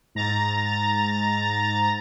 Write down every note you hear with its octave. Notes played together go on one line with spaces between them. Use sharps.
G#2 A#5 A6